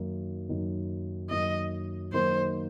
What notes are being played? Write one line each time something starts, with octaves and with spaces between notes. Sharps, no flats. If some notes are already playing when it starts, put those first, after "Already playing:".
Already playing: F#2 D#3 A#3 D#4
F#2 D#3 A#3 D#4
F#2 D#3 A#3 D#4 D#5
F#2 D#3 A#3 D#4 C5